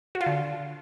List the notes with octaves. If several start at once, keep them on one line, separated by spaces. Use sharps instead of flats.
F#4
F4
D3